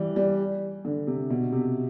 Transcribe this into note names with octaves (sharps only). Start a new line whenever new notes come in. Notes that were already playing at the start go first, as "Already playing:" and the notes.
Already playing: E3 G3
G3
D3
C3
B2
C3